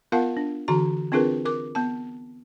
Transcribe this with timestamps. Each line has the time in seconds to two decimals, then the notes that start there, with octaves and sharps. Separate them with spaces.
0.12 B3 F4 A#4 F5 F#5 A5
0.37 D4
0.68 D3 E3 F#4 A#5
1.12 C4 D4 F4 G#4 A#4 B4
1.45 A#4 D6
1.75 B3 A5